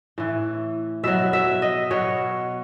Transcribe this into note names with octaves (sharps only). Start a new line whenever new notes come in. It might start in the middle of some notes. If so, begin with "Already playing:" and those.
A2 E3
B2 F#3 E5
E5
D#5
B2 F#3 C#5